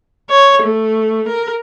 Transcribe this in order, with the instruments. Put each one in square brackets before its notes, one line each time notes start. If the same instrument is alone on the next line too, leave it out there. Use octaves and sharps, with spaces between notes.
[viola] C#5
A3
A#4